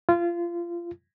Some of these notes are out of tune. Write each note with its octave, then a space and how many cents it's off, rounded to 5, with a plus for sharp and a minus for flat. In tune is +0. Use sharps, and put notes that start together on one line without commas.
F4 -25